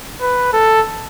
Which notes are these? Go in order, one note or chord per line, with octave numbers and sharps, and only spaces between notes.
B4
A4